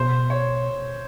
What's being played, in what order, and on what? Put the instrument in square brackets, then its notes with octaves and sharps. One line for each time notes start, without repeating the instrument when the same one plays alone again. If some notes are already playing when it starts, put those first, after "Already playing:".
Already playing: [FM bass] B2 [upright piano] C5
[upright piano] C#5